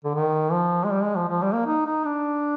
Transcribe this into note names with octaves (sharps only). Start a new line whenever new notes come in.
D3
D#3
F3
G#3
G3
G#3
F3
F3
G3
A#3
D#4
D#4
D4